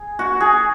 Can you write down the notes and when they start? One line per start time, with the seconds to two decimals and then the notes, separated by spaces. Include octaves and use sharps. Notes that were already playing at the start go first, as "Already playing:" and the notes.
Already playing: G#4
0.19 F#4
0.40 G#4